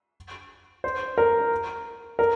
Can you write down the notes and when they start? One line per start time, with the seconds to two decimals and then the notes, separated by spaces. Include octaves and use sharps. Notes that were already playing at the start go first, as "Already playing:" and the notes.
0.84 C5
1.18 A#4
2.19 A#4